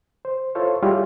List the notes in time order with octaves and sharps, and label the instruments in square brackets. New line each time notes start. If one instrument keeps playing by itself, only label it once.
[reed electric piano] C5
E4 F4 A4 C5 C#5 F5
G3 E4 F4 G4 G#4 C#5